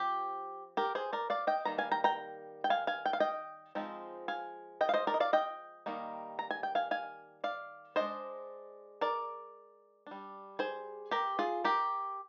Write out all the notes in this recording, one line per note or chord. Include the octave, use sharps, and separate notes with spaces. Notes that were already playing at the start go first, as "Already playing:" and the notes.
Already playing: F3 C4 G4
G4 A#4
G#4 C5
A#4 D5
D5 F5
D#5 G5
D#3 G3 A#3 A#5
F5 G#5
G5 A#5
G5 A#5
G5
F5 G#5
F5 G#5
G5
F5
D#5 G5
F3 G#3 C4 D#4
F5 G#5
D#5 G5
F5
C5 D#5
A#4 D5
D#5
D5 F5
D#5 G5
D#3 G3 A#3 D#4
A#5
G#5
G5
F5 G#5
F5 G#5
D5 F5
G#3 D4 C5 D#5
A#4 D5
G3 D4
G#4 C5
G4 A#4
F4 G#4
G4 A#4